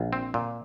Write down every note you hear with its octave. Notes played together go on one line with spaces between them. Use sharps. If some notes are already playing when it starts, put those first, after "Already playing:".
Already playing: A#1
C4
A#2